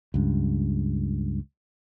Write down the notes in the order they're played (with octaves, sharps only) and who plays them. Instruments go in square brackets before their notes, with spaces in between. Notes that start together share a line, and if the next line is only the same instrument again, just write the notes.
[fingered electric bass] C#2 G2